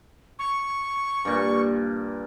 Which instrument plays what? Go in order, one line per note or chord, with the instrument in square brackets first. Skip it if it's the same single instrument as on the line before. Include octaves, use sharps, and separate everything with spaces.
[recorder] C#6
[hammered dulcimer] G2 A#2